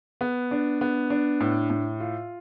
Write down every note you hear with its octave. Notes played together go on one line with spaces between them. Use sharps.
B3
D4
B3
D4
A2
A2
F4